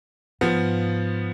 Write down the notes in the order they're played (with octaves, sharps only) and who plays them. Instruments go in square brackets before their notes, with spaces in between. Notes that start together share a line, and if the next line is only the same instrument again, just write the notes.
[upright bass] G#2 [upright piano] F3 B3